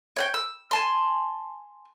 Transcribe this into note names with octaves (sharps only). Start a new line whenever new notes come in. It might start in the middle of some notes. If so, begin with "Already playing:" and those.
C#5 F#5 G5
E6
G#5 A5 C6